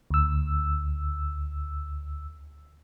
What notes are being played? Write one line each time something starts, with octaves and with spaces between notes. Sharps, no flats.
D2 E6